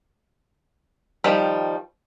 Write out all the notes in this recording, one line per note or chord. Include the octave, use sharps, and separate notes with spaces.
D#3 F3 G3 B5